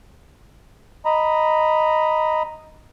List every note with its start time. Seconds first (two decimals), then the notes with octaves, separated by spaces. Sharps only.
1.05 D#5 A#5 B5